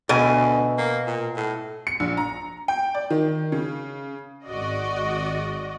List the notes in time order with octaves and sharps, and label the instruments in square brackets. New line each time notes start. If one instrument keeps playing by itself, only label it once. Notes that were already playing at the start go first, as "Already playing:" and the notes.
[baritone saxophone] D2 [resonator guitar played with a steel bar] B2 G#5
[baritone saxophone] A#3
A#2
A2
[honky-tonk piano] C#7
A#1
A#5
G5
D5
D#3
C#3
[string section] G#1 F#4 D5 D#5